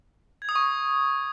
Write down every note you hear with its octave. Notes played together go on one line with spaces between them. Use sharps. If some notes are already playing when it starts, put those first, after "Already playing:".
G#6
D#6
C#6